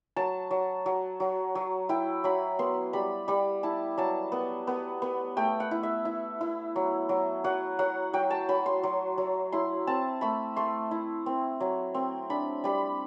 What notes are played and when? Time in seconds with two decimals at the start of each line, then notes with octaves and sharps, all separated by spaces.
0.16 F#3 A5
0.51 F#3
0.86 F#3
1.20 F#3
1.55 F#3
1.89 E4 G5
2.24 F#3 B5
2.59 B3 C6
2.93 G3 B5
3.28 G3 B5
3.63 E4 A5
3.98 F#3 A5
4.32 B3
4.67 B3
5.02 B3
5.37 A3 G5
5.60 F#5
5.71 E4
5.83 E5
6.05 E4
6.41 E4
6.76 F#3
7.09 F#3
7.44 F#3 F#5
7.79 F#3 F#5
8.13 F#3 G5
8.30 A5
8.49 F#3 B5
8.66 C6
8.83 F#3
9.18 F#3
9.52 E4 C6
9.87 C4 A5
10.21 A3 B5
10.56 A3 C6
10.91 E4
11.26 C4
11.60 F#3
11.94 C4
12.30 D4 B5
12.64 G3 B5